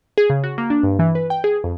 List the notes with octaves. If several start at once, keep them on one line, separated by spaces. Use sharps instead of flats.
G#4
C#3
F#4
A#3
D4
G2
E3
B4
G5
G#4
F2